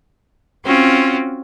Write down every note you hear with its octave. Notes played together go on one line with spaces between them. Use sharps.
C4 C#4 F4 F#4